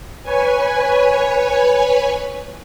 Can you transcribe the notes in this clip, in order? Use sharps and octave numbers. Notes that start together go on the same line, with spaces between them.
B4 C#5 G#5